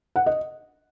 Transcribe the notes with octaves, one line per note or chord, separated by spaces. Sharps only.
F#5
D#5